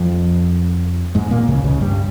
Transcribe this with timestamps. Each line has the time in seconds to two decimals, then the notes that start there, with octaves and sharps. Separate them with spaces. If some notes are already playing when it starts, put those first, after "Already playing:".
Already playing: F2 F3
1.15 G#2 G#3
1.31 A#2 A#3
1.48 C#2 C#3
1.64 C#2 C#3
1.81 G2 G3